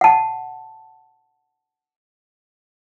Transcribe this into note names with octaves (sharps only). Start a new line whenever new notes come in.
F#5 A5